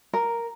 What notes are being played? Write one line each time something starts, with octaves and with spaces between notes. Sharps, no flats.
A#4